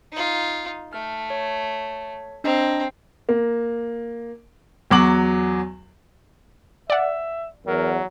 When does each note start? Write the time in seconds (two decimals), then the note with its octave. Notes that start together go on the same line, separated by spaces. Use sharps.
0.12 D#4 F4
0.93 A3 F6
1.30 C#5
2.44 C4 D4 D#5 A#5
3.29 A#3
4.91 E2 F#3 F#4 D6 F#7
6.90 D5 E5 F#5
7.67 E2 F#3 A#4